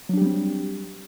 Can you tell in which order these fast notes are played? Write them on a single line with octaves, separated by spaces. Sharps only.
F#3 D4 G4 G3 C4